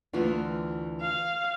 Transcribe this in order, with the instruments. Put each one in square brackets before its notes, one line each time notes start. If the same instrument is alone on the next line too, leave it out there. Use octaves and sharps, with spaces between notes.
[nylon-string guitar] D2 E3 F4
[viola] F5